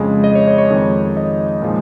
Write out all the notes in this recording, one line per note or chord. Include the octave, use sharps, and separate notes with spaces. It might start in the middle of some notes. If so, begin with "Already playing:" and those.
Already playing: F2 C#3 G#3 D#5
D#5
C#5
C#5
C#5
F2 D#3 G#3
D#5
A#2 F3 G#3